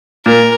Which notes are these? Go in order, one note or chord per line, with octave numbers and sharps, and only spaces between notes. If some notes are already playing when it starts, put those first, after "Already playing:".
A#2 A#4